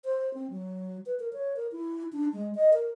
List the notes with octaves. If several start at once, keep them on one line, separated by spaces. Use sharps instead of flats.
C5
C4
F#3
B4
A#4
C#5
A#4
E4
D4
G#3
D#5
A#4